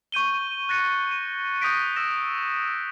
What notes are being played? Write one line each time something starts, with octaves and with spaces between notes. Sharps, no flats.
C#6 G6 D#7 G7
F#6 A6 A#6 C#7 D#7
D#7
D#6 G6 A#6 B6 D7
E6 A#6 E7